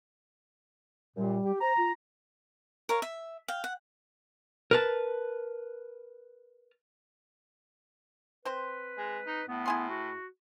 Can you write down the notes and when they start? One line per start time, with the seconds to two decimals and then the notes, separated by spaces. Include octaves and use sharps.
1.17 F#2 A#2 G3
1.45 G4
1.61 C5 A#5
1.77 F4
2.89 A#4 C#5 F5
3.02 E5
3.48 F5 G5
3.64 F#5
4.71 A#4 B4 A5
8.45 C4 B4 C5
8.98 G#3
9.27 D#4
9.48 A2 B3
9.66 E4 G#4 C6
9.89 F#4